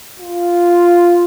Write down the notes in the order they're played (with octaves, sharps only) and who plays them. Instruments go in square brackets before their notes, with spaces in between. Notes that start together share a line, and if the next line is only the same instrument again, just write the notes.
[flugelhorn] F4